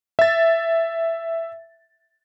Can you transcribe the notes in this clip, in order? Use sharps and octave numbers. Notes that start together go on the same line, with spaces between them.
E5 A6